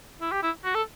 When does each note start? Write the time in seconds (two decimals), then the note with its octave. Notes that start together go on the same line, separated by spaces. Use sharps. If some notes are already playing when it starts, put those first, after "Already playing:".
0.22 E4
0.32 G4
0.43 E4
0.64 F#4
0.75 A4